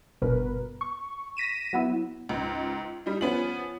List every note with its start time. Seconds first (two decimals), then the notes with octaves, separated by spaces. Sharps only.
0.22 G1 B2 A#4 B4
0.81 C#6
1.37 A#6 B6 D#7 E7
1.73 F#3 B3 E4
2.29 C#2 G#2
3.06 G3 D#4
3.21 F3 B3 C#4 F#7